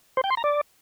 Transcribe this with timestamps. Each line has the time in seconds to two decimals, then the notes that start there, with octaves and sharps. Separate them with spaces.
0.17 C5
0.24 G5
0.30 C6
0.37 A#5
0.44 D5